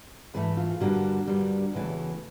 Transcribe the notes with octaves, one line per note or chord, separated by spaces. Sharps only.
G#2 E3 A3 B4
F4
G2 D3 G3 A#3 F#4
G2 D3 G3 A#3
E2 C#3 E3 A3